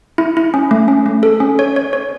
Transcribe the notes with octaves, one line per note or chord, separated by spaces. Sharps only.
E4
E4
C#4
A3
C#4
A3
A4
C#4
C#5
C#5
C#5